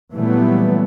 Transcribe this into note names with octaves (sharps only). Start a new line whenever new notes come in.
A#2 E3 F#3 G3 A3 B3